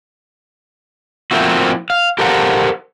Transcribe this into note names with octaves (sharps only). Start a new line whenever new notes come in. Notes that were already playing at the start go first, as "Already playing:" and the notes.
F3 A3 A#3 C4 E4 F#4
F5
G4 A4 A#4 C5 F5 F#5